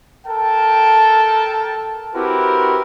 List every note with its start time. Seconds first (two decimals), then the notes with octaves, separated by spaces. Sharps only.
0.27 A4 A#4 G5 A5
2.15 C4 E4 F#4 G4 A#4 B4